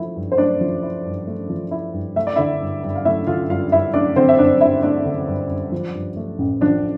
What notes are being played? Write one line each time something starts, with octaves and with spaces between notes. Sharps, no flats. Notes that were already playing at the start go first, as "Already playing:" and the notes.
Already playing: F3 A3 E4
G2
C5
A3 D4 D5
F3
E4
G2
A3
F3
E4
G2
A3 E5
D5
D3 E4 E5
G2
G2
F5
A3 E4 E5
D3 F4 F5
G2 F4 F5
G2 E4 E5
A3 D4 D5
D3 C4 C5
E5
G2 D4 D5
G2 E4 E5
A3 D4 D5
D3
G2
G2
F3
G2
A3
A1
F3 D4 D5